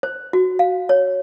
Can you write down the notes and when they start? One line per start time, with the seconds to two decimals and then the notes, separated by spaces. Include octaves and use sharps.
0.03 C5
0.33 F#4
0.59 F5
0.89 C#5